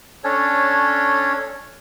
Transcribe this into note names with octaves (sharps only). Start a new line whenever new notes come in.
C#4 D4 A4 C#5